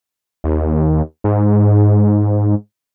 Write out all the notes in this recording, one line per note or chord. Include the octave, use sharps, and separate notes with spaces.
D#2
G#2